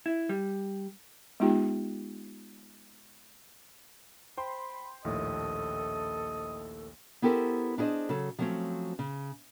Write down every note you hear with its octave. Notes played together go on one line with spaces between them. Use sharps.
E4
G3
G#3 B3 D#4 F4 G4 G5
C5 G5 B5 C6
A#1 D#2 A2 A4 D#5
B3 E4 G4 A4 A#4 C5
D4 E4 G#4 C5 D#5
C#3 F#3 A4
F3 F#3 A3 C4 C#4
C#3